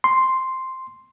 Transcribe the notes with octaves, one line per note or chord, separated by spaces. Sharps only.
C6